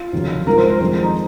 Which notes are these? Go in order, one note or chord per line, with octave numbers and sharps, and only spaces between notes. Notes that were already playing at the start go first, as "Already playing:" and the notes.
Already playing: F4
F1 D#2 C#3 F#3
A#1 G#2 F3 A#4
C5
C5
F2 D#3 G#3 C5
D#4